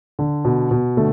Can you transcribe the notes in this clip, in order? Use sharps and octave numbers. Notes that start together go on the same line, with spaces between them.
D3
B2
B2
D3 A3